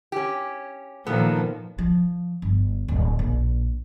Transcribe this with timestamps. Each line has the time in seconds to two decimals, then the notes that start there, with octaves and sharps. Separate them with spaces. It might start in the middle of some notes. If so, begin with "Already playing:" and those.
0.12 C#4 G4
1.07 A#2 D#3 F3 B3 A4
1.79 F3
2.42 G1
2.88 D1
3.19 A#1